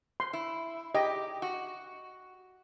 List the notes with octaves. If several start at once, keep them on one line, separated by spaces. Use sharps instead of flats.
C6
E4
G4 D#5
F#4